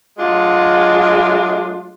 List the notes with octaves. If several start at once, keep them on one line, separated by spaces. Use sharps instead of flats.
F#3 G#3 A3 D4 F4 F#4